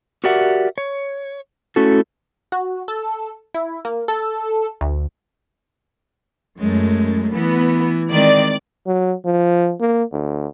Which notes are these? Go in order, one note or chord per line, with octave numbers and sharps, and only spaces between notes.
F#4 G4 A#4 D5 E5 F#5
C#5
A3 C#4 E4 F#4 A4
F#4
A4
E4
A#3
A4
D2
F#2 G#3 A3
E3 B3
D#3 G#3 C4 D5
F#3
F3
A#3
D2